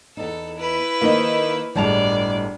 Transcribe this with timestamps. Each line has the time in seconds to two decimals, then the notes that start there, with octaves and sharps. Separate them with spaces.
0.17 E2 D#4 A4
0.58 E4 B4
1.01 D#3 A#3 D#4 C5
1.75 G1 A2 G#3 D5 A5 F7